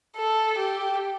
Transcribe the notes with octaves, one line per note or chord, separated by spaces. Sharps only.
A4
G4